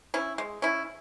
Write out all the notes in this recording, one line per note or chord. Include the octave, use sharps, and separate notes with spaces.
C#4 E4
G#3
C#4 E4